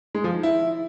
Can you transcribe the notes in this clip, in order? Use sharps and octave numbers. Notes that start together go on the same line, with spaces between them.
G#3
F3
D#4
E4